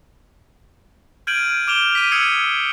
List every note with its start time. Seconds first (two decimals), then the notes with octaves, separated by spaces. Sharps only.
1.27 F6 G6 G#6 D7 D#7 F#7
1.68 D6 F6 D7 E7 F7 G7
1.95 B6 D#7
2.12 D#6 E6 G#6 C7 C#7